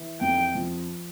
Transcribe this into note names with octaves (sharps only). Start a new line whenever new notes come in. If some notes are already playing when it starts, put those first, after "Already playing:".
Already playing: E3
F2 G5
F3